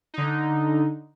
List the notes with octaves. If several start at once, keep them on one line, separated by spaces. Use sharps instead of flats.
D3 D#4